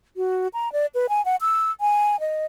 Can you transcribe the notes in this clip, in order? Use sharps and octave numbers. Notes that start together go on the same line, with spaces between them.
F#4
A#5
D5
B4
G#5
F#5
E6
G#5
D#5